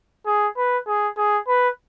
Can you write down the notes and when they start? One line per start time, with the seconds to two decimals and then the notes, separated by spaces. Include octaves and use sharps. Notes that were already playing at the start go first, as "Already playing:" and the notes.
0.26 G#4
0.57 B4
0.87 G#4
1.17 G#4
1.48 B4